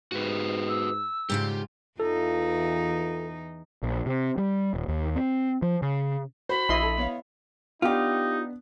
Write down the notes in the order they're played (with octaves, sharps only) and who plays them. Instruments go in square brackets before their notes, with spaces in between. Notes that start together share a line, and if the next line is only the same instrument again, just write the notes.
[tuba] G#2 [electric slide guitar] F#4 G4 B4
[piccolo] E6
[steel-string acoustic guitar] G#2 C#3 F4 [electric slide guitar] G4
[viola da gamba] E2 E3 D#4 [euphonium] F4 [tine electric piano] A4
[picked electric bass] A#1
C3
G3
D#1
D#2
C4
F3
C#3
[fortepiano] F#4 C5 [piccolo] B5
[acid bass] A#1 [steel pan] E4 D#5 C6
[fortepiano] A4
B3 C#5 F5
[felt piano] B3 D4 [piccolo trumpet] D#4 [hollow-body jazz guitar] F4 G4